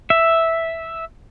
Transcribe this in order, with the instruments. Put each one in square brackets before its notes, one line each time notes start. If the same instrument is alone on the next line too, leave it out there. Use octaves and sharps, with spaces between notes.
[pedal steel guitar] E5